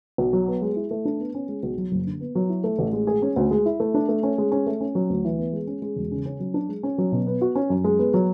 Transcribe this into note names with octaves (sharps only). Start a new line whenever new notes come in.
B1
F#3
B3
G#3
E4
A3
D4
B3
C#4
G#3
B1
F#3
F#1
D3
B3
F#3
E4
A3
A1
G#3
G#4
C#4
D2
G#3
E4
A3
D4
A3
C#4
G#3
C#4
A3
C#4
F#3
D2
E3
B3
G#3
C#4
G#3
E1
C#3
C#4
F#3
D4
G#3
C#4
F#3
B2
B3
F#4
C#4
F#2
G#3
B3
F#3